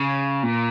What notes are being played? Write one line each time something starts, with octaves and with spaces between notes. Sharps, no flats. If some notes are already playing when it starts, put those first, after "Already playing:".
Already playing: C#3
A#2